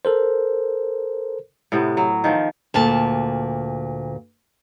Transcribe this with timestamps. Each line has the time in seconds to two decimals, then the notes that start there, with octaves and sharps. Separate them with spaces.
0.05 A4 A#4 C5
1.72 A2 C3 B3
1.97 F#3
2.24 D#3 F3
2.74 D2 A#2 A5